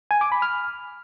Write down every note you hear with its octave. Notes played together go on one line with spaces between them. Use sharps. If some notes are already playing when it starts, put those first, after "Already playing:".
G#5
D6
B5
F6